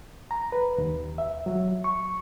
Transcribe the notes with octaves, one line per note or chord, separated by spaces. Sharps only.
A#5
B4
D#2
E5
F#3
C#6